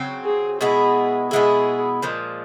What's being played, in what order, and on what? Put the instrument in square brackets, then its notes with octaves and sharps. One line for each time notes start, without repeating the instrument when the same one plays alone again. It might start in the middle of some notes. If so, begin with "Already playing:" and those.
Already playing: [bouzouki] C#3 F#3 C4
[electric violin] G#4
[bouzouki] B2 G#3 B3 E4 [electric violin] G#4
[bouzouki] B2 G#3 B3 E4 [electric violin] G#4
[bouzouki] A#2 F3 G#3